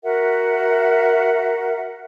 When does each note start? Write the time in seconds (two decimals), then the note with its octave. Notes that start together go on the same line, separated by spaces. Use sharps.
0.04 F#4 A#4 E5 F#5